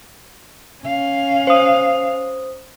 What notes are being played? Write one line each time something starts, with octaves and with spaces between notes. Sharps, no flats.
C#4 F5
C5 D#6